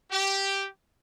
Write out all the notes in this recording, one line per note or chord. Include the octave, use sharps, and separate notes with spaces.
G4